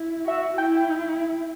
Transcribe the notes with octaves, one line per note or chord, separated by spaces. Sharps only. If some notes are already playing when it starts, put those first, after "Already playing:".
Already playing: E4
F#4 E5
E4 G5